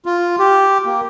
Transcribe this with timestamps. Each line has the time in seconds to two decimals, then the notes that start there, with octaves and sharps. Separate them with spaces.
0.06 F4
0.39 G4
0.86 A#3